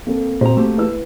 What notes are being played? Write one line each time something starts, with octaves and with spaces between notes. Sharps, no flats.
A#3 C4 A4
A#2 C4 F#4 C5 A#5
A3 A#3 G4
E4 B4 E6